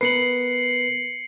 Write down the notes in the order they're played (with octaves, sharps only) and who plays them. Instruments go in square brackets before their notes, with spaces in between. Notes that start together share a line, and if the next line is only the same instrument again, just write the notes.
[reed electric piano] B3 A#4 B4 [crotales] C7 C#7 F#7